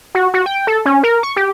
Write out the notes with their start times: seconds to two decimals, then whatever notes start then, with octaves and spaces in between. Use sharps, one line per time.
0.15 F#4
0.34 F#4
0.46 G5
0.67 A4
0.86 C#4
1.03 A#4
1.23 C#6
1.36 G4